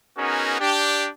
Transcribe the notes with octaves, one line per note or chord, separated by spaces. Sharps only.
B3 C#4 D#4 F#4 G#4 A#4
D4 G4